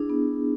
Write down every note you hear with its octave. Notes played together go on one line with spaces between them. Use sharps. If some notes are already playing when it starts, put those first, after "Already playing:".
Already playing: D4 E4 G#4
B3